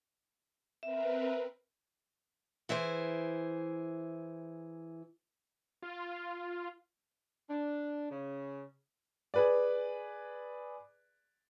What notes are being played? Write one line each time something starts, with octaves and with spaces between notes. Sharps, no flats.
C4 A#4 B4 E5
E3 E4 G#4 C5
F4
D4
C#3
G#4 B4 D5